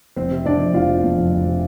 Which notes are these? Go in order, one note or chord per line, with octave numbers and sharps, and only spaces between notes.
F1 C4 C5
C3
F1 D4 D5
F2
F1 F4 F5
C3
F1
F2
F1
C3